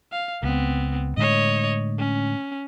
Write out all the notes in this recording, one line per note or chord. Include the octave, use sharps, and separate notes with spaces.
F5
C#2 B3 C4
A2 D3 G#3 C#5 D#5
C#4